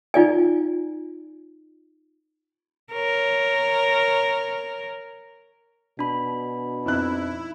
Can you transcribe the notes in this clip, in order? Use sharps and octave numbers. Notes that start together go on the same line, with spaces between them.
D#4 F4 D5 G#5
A#4 C#5
B2 D4 B5
F2 D#4 E4 F#6